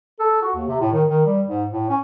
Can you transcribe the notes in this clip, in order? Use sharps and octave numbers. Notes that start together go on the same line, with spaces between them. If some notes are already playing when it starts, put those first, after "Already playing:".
A4
F#4
D#2
C3
A2
D#3
D#3
G3
G#2
A2
C#4